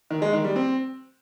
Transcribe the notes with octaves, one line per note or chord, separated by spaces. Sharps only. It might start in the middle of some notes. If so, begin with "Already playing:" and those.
D#3
G#3
D#3
G3
C4